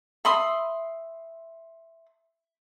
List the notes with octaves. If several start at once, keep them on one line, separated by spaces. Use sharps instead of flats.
E5 B5 C6 D#6